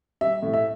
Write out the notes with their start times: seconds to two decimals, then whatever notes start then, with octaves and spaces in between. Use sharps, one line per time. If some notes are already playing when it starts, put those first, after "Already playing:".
0.21 G3 E5
0.42 A2
0.54 E5